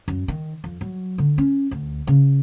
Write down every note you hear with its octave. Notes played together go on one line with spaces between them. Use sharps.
F#2
D#3
F2
F#3
D3
C#4
D2
C#3